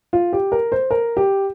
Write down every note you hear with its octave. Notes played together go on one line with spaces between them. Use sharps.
F4
G4
A#4
C5
A#4
G4